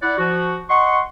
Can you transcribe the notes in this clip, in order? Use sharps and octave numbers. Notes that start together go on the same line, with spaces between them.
E4 D5 F#5
F3 F#4
D#5 F#5 C6 C#6